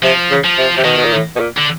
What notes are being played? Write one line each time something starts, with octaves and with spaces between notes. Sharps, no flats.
C3 F3
C#3
F3
C3
C3
B2 D#3
B2
A#2
A2
B2
A#2
D3